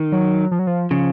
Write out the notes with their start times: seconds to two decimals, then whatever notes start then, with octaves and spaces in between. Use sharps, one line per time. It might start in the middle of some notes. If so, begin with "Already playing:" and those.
Already playing: D#3
0.12 F#3
0.51 F3
0.59 F#3
0.67 F3
0.90 C#3 F3